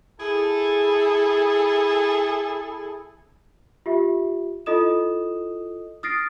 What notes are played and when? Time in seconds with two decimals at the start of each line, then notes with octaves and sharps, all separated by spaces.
0.20 E4 G#4 A4
3.86 F4 G4 E5
4.66 E4 F4 A4 D#5 D#6 E7
6.03 D#6 F6 A6 A#6 C7 D7